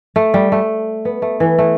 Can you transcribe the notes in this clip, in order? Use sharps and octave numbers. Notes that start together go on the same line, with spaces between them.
A3
G3
A3
B3
A3
E3
A3